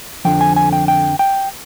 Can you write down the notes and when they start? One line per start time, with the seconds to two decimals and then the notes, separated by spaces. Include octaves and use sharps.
0.25 F2 D3 F3 G5
0.41 G#5
0.56 G#5
0.73 G5
0.88 G5
1.19 G5